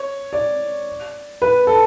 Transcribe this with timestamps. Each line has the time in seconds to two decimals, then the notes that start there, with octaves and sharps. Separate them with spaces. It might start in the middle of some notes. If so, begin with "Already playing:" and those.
Already playing: C#5
0.33 D5
1.42 B4
1.67 A4